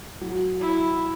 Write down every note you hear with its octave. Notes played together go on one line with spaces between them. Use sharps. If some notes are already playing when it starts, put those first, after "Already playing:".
F#3
E4